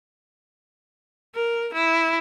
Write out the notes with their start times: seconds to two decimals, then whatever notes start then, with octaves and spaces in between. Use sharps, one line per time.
1.35 A#4
1.74 E4